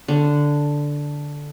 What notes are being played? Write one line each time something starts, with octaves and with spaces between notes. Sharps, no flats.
D3